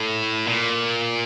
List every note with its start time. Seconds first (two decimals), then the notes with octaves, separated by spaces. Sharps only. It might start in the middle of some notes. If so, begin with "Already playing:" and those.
Already playing: A2
0.47 A#2